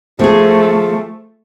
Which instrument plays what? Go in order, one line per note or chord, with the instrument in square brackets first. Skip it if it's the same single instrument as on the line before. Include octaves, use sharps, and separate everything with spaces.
[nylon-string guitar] F3 G#4 [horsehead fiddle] A3